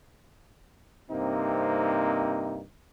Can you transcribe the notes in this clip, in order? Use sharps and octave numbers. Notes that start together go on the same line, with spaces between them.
G2 C3 A#3 C4 D#4